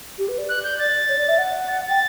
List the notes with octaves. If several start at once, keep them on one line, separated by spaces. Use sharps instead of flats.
G4
B4
D5
F#6
G6
A6
C#5
D5
E5
F#5
A6
G5 A6